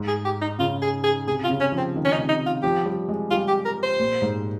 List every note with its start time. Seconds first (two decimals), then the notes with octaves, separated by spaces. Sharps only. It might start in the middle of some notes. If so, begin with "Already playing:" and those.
Already playing: G#2
0.08 G#4
0.25 G4
0.42 D#4
0.59 C#3 F4
0.82 G#4
1.04 G#4
1.27 C3 G#4
1.44 F4
1.49 C#3
1.60 C#4
1.72 F3
1.78 C4
1.96 D#3
2.05 C#4
2.12 D#4
2.18 C3
2.29 D#4
2.46 F4
2.63 F3 G4
2.85 G3
3.09 G#3
3.31 G3 F4
3.48 G4
3.65 A#4
3.83 C5
3.99 A#2
4.22 G#2